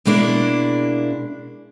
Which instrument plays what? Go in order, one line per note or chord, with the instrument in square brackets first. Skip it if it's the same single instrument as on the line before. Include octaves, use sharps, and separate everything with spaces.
[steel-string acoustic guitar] B2 G#3 A#3 D4 E4